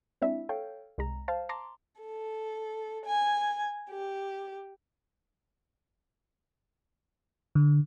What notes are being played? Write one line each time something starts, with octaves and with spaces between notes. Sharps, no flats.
G#3 C4 D4 E4 E5
A4 C#5 F5 G5
C2 G#3 A#5
C5 F5 A5
A5 A#5 C6 D6
A4
G#5
G4
D3